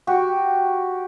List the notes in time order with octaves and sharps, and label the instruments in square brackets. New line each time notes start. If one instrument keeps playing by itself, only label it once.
[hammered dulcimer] F#4 G4